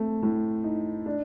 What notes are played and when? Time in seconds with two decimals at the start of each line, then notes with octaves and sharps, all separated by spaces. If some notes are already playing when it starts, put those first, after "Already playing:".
Already playing: A3 C4
0.22 A2
0.64 D#4
1.06 D4